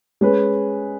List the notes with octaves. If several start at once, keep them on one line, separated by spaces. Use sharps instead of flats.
G#3 C#4 G#4 B4